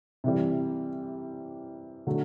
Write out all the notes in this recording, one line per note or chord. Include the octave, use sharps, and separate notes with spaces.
C3 E3 G3
D3 F#3 A3